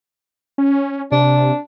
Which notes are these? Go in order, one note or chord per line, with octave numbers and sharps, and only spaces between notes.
C#4
C3 D4